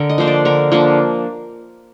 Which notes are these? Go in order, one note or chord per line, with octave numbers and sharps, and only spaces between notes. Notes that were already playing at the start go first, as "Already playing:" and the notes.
Already playing: D3 A#4
D#5
F3 A#3 D4 C5
D5
D3 A#4
F3 A#3 D4